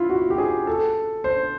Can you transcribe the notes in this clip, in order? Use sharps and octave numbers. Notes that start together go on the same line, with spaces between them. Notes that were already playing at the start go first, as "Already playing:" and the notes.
Already playing: E4 F4
F#4
G4
G#4
A4
C5